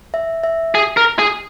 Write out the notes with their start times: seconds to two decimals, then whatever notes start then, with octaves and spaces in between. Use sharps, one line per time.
0.14 E5
0.44 E5
0.75 G#4
0.97 A#4
1.19 G#4